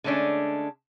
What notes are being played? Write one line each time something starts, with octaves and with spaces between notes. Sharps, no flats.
D3 G#3 A3 C#4 D4